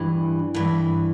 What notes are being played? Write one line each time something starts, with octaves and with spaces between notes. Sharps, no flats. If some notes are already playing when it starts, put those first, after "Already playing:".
Already playing: G2 E3
G2 E3